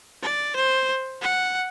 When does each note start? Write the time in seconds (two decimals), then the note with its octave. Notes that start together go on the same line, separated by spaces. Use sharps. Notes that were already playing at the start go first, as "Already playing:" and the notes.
0.22 D5
0.56 C5
1.22 F#5